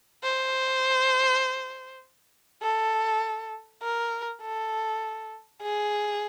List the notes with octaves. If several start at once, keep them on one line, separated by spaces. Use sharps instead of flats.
C5
A4
A#4
A4
G#4